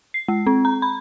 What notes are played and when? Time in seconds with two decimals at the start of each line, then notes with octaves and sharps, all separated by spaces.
0.14 C7
0.28 G#3
0.47 C4
0.65 A#5
0.82 B5